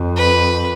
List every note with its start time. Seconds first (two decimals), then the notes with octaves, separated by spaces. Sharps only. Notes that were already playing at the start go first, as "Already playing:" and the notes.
Already playing: F2
0.17 B4